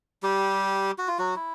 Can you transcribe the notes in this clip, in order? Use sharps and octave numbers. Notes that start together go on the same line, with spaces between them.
G3 G4
F#4
F4
F#3 F#4
E4